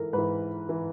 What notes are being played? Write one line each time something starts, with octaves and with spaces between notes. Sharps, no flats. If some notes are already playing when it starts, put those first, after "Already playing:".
Already playing: G#2 E3 A4 A#4
G#2 E3 B4
E3